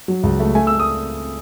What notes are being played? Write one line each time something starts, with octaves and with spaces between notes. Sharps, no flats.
F#3
C#2
A3
A3 G#5
E6
A3
D#6